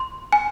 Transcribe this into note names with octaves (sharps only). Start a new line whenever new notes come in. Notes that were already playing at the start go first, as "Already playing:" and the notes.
Already playing: C6
G#5